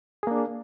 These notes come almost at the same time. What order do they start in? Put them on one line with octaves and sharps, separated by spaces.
G#4 A#3 D4